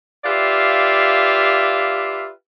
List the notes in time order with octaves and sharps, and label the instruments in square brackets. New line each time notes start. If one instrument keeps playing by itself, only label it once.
[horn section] F4 G4 B4 D5 E5 F5